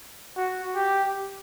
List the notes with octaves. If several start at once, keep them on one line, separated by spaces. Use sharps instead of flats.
F#4
G4